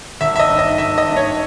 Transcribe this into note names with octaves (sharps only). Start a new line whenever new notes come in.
G#1 E5
E5
D#5
G2 D#3
D#5
G#1 E5
D#5
G2 D#3
C#5